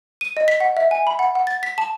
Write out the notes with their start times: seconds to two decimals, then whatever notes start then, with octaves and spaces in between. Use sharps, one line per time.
0.21 D#7
0.37 D#5
0.48 B6
0.60 F#5
0.77 E5
0.91 G#5
1.07 B5
1.19 F#5
1.35 F#5
1.47 A6
1.63 B6
1.78 A5